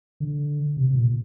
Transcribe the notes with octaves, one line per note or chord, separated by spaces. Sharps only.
D3
C3
C3
A#2